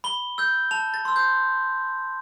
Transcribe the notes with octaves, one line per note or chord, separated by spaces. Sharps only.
B5 G7
E6 G6
A5 F7
A6
C6 E6
G6